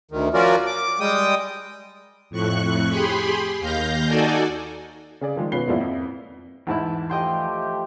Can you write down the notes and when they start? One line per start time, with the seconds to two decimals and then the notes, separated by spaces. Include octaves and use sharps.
0.11 D2 D#3
0.34 F3 C#4 F4 F#4 A#4 D5
0.66 D6
1.00 G3 G#3 G5 D#6
2.30 F2 A2 C#6 F#6
2.90 G4 G#4 B5 C6
3.60 D#2 F5 G6 A#6
4.06 D#4 F#4 A4 D5 G#5
5.21 C#3 G#4 D5
5.36 D#3 F3 G#3
5.52 B2 C#4 F4 B4 C7 G7
5.68 E2 G#2 F3 A#3 E4 D5
5.80 F2
6.67 E2 G#2 E3 E4 A5
7.09 F3 A3 G4 D#5 G5 C6